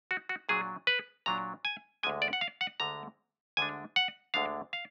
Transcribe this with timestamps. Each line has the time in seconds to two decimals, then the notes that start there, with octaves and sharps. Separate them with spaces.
0.11 F#4
0.29 F#4
0.49 A#2 F#3 D4 G#4
0.87 B4
1.26 A#2 F#3 D4 A#5
1.65 G#5
2.03 D2 D3 G#3 D4 G#5
2.22 D5
2.33 F#5
2.41 F5
2.61 F#5
2.80 D2 D3 G#3 D4 A#5
3.57 D2 D3 G#3 D4 G#5
3.96 F#5
4.34 D2 D3 G#3 D4 F5
4.73 F5